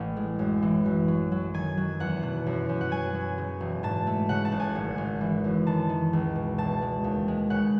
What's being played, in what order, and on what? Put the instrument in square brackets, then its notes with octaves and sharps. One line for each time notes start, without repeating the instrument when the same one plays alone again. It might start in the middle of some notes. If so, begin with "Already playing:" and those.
Already playing: [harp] A1
G#3
F#2
E3
F#2
F#3
F#3
D#3 G#5
F#3
E2 F#5
B2
F#2
F#2
F#5
F#3 G#5
F#3
C#3
E1
G#2 A5
A3
C#3 F#5
A5
F#1
G#5
G#1
G#1
E3
F#2
D#3 A5
D#3
C#2
B2
E1 A5
G#3
D#2
G#3
C#3 F#5